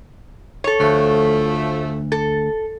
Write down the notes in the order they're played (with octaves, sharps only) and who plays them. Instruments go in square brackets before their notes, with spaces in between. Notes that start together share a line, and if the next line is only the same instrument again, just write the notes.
[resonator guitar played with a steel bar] A4 C#5
[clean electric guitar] D2 [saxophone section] F3 A3
[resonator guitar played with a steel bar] A4